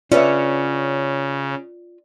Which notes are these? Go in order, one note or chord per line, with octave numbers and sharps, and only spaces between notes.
C#3 C#4 F4 B4 D5 E5 F#5